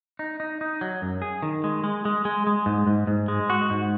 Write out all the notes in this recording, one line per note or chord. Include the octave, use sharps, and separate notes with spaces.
D#4
D#4
D#4
F#3
F#2
G#4
D#3
G#3
G#3
G#3
G#3
G#3
G#2
G#2
G#2
G#3
F#4
G#2